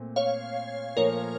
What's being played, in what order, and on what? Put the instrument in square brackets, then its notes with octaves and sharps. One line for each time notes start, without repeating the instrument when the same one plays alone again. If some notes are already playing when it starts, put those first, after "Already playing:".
Already playing: [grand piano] A#2 A3 C4
[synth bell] C#5 F5
[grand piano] A#2 F3 A3 [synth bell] A#4 C#5